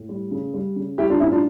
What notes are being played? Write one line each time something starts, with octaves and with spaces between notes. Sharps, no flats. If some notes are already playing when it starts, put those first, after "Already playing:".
Already playing: A2
G3
C#3
G3
C#3
G3 E4 G4
D4 F4
A2 C#4 E4
D4 F4